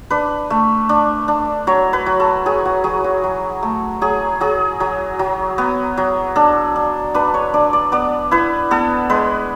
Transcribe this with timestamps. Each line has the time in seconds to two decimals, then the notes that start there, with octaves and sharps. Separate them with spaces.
0.10 D4 B4
0.50 A3
0.89 D4
1.28 D4
1.67 F#3 C#5
1.93 B4
2.06 F#3
2.20 A4
2.46 F#3 G#4
2.65 F#4
2.84 F#3 G#4
3.04 F#4
3.24 F#3
3.63 A3
4.01 F#3 G#4
4.41 F#3 G#4
4.80 F#3
5.19 F#3
5.58 B3
5.97 F#3
6.36 D4 A4
6.76 D4
7.14 D4 B4
7.34 C#5
7.54 D4 D5
7.73 D5
7.92 B3 D5
8.31 E4 B4
8.71 B3 A4
9.10 G#3 B4